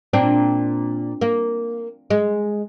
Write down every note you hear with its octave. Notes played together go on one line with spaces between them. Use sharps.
A#2 C4 D4
A#3
G#3